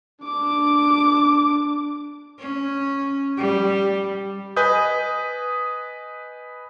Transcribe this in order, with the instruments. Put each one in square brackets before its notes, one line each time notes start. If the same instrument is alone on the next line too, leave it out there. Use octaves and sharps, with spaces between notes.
[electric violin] D4 D6
[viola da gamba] C#4
G3
[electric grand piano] B4 D#5 G#5 B5 D#6 G6